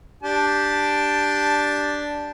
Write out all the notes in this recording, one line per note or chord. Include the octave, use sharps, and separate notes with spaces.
D4 G4 A5